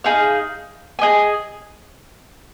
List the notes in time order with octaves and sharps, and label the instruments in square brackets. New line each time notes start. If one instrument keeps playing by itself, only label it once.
[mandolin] D#4 G#4 F5
G#4 D#5 G#5